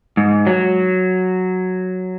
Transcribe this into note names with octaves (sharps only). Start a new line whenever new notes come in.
G#2
F#3